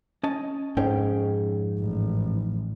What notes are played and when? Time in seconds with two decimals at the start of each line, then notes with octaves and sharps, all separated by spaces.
0.23 C#4 D#5 A5
0.77 F2 G#2 C#4 G5
1.79 A1